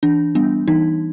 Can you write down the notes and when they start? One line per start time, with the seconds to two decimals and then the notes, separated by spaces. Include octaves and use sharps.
0.03 E3 D4
0.35 G3 B3 D4
0.68 E3 D#4